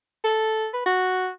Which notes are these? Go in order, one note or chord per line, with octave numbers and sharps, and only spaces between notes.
A4
B4
F#4